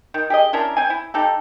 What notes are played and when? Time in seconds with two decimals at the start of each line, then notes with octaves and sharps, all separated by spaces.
0.14 D#3
0.30 G4 G#4 D#5
0.53 C#4 D4 E4 A#4
0.77 C4 G#5
0.90 E4
1.14 D#4 G4 A4